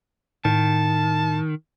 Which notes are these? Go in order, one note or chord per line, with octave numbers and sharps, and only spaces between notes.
A2 D#3 A5